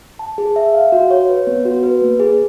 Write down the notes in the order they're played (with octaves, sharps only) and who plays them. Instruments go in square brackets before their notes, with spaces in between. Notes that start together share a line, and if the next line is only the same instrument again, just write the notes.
[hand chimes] A5
G#4
E5
F5
F#4
C#5
B4
B3
F#4
B4
A#3
G#4